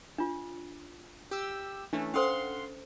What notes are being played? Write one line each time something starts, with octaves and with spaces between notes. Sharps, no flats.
D4 F4
G4 E6
E3 A3 C#4 D4
C#4 A4 C5 F5 F#5 C6